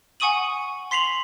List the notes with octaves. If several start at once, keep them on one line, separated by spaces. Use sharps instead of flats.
F#5 G#5 C#6 D#6 D#7 F#7
C6 B6 C7 F7 F#7